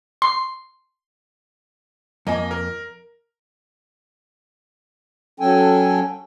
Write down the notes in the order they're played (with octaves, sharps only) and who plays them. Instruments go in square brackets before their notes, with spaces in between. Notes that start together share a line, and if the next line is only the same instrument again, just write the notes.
[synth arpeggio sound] C6
[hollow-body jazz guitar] F2 [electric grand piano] A#3 D#5 G#5
[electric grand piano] A#4
[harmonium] F#3 C#4 A4 G5 G#5